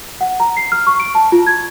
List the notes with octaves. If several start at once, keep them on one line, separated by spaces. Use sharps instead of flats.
F#5
A#5
C7
F6
C#6
D7
A5
F4
G#6